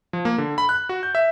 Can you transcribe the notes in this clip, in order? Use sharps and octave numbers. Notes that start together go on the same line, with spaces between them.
F3
A#3
D3
B5
F#6
F#4
G6
E5